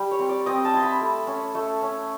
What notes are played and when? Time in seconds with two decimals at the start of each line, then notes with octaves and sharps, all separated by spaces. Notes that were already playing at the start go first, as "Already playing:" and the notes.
Already playing: G3
0.11 C#5
0.19 C4
0.29 D5
0.46 C4 D#5
0.65 A5
0.73 E4 C6
0.83 B5
1.01 A3
1.27 C#4
1.55 A3
1.82 C#4